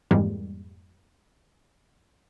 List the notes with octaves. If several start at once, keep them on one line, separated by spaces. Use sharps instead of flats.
F2 G#2 E3 G3 G#3 A#3